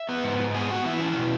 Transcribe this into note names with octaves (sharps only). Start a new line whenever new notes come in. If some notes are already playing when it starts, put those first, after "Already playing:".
Already playing: E5
B3
G#2
G#2
B3 G#4 G#5
B3 F#4 F#5
E3 E4 E5
C#4
B2